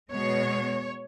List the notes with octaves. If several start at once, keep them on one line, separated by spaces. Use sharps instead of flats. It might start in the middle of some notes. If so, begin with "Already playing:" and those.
B2 G#3 C#5